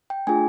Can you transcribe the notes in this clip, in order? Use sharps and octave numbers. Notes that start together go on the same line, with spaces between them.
G5
A3 D4 F4 G#4 G#5